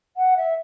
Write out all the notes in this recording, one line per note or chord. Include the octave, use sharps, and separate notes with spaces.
F#5
E5